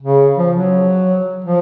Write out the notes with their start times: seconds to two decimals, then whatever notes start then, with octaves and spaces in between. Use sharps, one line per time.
0.02 C#3
0.38 F3
0.56 F#3
1.44 F3